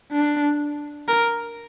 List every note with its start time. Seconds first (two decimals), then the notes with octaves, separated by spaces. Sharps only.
0.12 D4
1.08 A#4